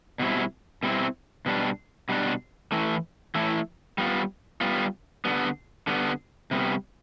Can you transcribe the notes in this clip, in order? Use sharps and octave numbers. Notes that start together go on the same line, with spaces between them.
B2 G3 C4 E4
B2 G3 C4 E4
B2 G3 D4
B2 G3 D4
E3 A3 E4
E3 A3 E4
G3 B3 F4
G3 B3 F4
D3 G3 B3
D3 G3 B3
C3 G3 B3